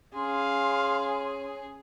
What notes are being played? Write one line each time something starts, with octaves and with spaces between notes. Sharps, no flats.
C#4 G#4 F5 C6